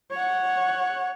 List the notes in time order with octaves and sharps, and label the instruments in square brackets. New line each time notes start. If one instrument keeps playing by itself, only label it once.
[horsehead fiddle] C#5 F#5